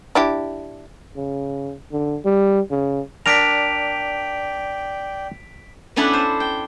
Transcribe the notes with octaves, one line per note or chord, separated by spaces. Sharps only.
D4 E4 G4
C#3
D3
G3
C#3
D4 A#4 D5 G5 A#5 B6 D7 F7
B3 C#4 D4 E4 A4 B4
C5
G5